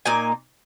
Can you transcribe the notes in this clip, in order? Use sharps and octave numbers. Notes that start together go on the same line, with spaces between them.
A#2 A#3 D#4 G#5